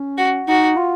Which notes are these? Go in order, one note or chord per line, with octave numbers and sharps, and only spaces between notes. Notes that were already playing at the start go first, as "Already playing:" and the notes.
Already playing: C#4
F#4
D#4 F#4
F4